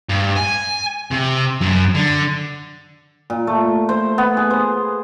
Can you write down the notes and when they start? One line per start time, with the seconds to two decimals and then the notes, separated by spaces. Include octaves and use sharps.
0.10 G2
0.36 G#5
1.11 C3
1.61 F#2
1.94 D3
3.30 A#2
3.47 A3
3.89 C5
4.18 B3
4.37 G#4
4.51 C5